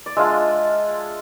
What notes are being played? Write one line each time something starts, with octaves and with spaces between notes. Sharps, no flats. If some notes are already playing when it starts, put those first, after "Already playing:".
D5
G#3 D4 F4 E5